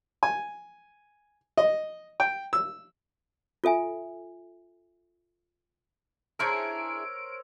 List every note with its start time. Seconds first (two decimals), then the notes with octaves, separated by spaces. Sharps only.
0.23 G#5
1.58 D#5
2.20 G5
2.53 E6
3.64 F4 A4 E5 G#5
6.39 D4 E4 G#4 A#4 C5 C#5 E6 D7